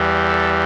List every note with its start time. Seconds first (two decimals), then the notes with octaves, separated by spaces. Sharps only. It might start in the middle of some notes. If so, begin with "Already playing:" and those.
Already playing: E2 E3 G3
0.28 A4